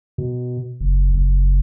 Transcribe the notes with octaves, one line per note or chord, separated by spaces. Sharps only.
B2
F#1
F#1